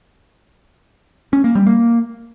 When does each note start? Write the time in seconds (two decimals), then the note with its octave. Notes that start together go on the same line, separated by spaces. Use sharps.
1.33 C#4
1.44 A#3
1.55 G3
1.67 A#3